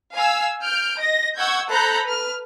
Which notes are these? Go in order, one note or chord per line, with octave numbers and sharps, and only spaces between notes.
F5 G#5 E6
F6 G6 D7
D#5 A#6
F#5 C#6 E6 G6 G#6
A4 C5 A#5 B5 F#6 G6
B4 F6